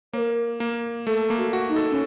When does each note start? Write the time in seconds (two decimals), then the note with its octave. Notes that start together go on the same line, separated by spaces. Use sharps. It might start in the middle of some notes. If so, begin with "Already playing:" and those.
0.13 A#3 A#4 C#5
0.60 A#3
1.07 A3 A4
1.30 A#3
1.37 F#4
1.53 F#4
1.69 D#4
1.76 A4
1.90 C#4